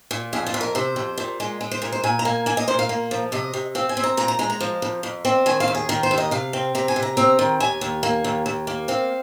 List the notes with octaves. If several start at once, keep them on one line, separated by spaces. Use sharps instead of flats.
A#2
F2 G#4
F4
F2
A#4
C3 C5
F2
A#2
G#3
G#3
C5
A#2 A#4
C5
A#2 G#5
A#5
A#3 G#5
A#3 G#5
D#5
A#2 C5
F5
A#3
F3
C3 D#5
C3
C4 F5
G#5
C4
A#5
A#2 A#5
A#5
G#3 A#5
A#5
F3
F2
F2
C4
D#3 G#5
F5
D#2
G#4
D#3 A#4
C5
D#2
D#5
C3 F5
C4
C3 A#5
G#5
C3
A#5
C4 A#5
D#3
D#2 G#5
D#2
A#3
D#2
D#2
A#3
C4 F5